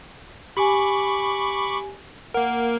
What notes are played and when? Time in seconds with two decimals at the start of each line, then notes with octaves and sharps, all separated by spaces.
0.57 G4 G#5 B5 C#6 D6
2.34 A#3 A#4 F#5